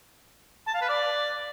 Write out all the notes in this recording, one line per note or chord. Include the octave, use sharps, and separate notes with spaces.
A5
F5
B4
D5